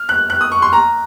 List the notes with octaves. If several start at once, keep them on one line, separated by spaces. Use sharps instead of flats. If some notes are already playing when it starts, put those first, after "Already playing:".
Already playing: F6
F#6
F#6
D#6
C#6
C6
A#5